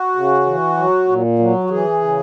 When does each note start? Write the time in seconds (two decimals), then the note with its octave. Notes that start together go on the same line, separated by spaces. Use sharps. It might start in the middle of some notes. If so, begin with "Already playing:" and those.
Already playing: F#4
0.15 C#3
0.46 E3
0.77 F#3
1.08 A#2
1.39 F#3
1.64 F#4
1.70 E3 G#4
2.01 C#3